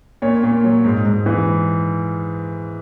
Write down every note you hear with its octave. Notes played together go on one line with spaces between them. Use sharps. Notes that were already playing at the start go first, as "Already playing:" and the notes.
A#2 C#5
A#2
F#3
G#2
G#2
E3